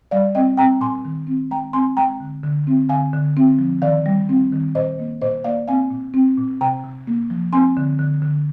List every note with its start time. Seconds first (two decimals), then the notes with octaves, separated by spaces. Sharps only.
0.11 G3 D5 F5
0.35 C4 D#5 G5
0.57 C4 G5 A#5
0.81 A#2 G#5 C6
1.05 D#3
1.27 C4
1.51 G#3 G5 A#5
1.73 C4 G#5 C6
1.97 G#3 G5 A#5
2.20 D3
2.44 D3
2.67 C4
2.89 D3 F5 G#5
3.14 D3
3.37 C4
3.59 F3
3.82 D#3 D5 F5
4.06 G3
4.29 C4
4.52 D#3
4.75 A#2 C5 D#5
4.99 A#3
5.22 A#2 C5 D#5
5.44 A#3 D5 F5
5.68 C4 F5 G#5
5.91 A#2
6.14 C4
6.37 A#2
6.61 C3 G5 A#5
6.84 C3
7.07 A#3
7.30 F3
7.53 C4 G#5 C6
7.77 D3
7.99 D3
8.22 D3